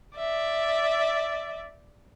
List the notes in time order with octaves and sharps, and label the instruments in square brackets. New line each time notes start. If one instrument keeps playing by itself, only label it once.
[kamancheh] D5 E5